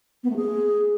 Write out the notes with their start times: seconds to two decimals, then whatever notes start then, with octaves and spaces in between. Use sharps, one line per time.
0.24 B3
0.30 A3
0.36 G#4